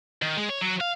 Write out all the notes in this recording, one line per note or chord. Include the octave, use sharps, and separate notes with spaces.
D#3
G#3
C#5
F#3
F5